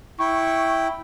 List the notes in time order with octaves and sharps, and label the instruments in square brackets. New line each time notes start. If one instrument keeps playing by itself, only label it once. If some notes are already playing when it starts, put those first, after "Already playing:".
[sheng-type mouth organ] E4 G5 [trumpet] C#6